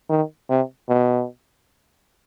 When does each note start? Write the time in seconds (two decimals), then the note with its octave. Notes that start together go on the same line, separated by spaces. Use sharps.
0.10 D#3
0.49 C3
0.89 B2